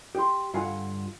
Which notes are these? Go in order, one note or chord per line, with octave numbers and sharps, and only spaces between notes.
G4 C6
G2 D3 F4 F5 F#5 G#5